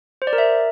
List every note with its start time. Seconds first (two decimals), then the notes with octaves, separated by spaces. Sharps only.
0.22 C5
0.27 D5
0.33 A#4
0.38 E5